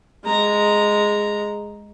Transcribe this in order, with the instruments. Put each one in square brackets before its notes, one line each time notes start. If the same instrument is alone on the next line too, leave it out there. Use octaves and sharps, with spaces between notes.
[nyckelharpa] G#3 A#5